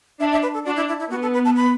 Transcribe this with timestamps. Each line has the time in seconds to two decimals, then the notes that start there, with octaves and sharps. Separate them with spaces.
0.20 D4 E5
0.32 E5
0.43 B4
0.54 A4
0.66 D4 F#4
0.76 E4
0.88 E4
1.00 E4
1.10 B3 F#4
1.22 A4
1.34 B4
1.45 A5
1.56 B5